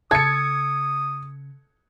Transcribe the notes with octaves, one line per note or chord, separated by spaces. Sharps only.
C#3 A4 D#6 G#6 C#7